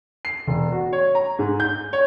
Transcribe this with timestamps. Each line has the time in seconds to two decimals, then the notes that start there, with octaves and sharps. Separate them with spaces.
0.25 C7
0.47 E1
0.72 F#4
0.93 C#5
1.15 A#5
1.39 G#2
1.60 G6
1.93 C#5